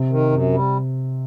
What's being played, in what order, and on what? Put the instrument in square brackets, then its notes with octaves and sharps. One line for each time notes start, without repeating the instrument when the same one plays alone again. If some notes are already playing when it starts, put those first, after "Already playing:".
Already playing: [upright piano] C3
[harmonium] D#3
F#2
G3